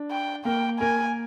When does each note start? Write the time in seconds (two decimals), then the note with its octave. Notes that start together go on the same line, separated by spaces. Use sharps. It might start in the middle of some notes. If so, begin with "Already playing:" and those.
Already playing: D4
0.11 G5
0.45 A#3 A#4 G5
0.80 A#3 A#4 G#5